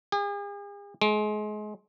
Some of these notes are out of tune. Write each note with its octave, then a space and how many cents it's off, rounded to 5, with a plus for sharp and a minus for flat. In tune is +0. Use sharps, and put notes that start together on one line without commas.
G#4 -45
G#3 +30